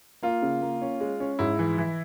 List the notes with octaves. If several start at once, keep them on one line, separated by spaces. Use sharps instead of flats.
A#3 F4
C#3
A#3
C#4
G#3
C#4
G#2 E4
E3
E3